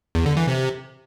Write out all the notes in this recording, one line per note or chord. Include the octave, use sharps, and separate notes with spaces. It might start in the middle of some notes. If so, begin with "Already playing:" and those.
E2
D3
E3
C3